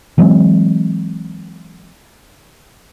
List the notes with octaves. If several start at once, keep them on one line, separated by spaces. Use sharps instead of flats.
E3 F#3 G#3 C4